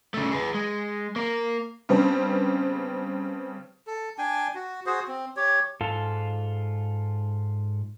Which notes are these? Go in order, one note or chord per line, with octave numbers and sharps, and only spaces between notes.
C#3 A3
G#4 B4
G#3
A#3 A#4
C#3 G3 B3 C4 D4
A4
D4 G5 G#5
F#4
F#4 G#4 C5
C4
G4 C#5
G#2 F4 A4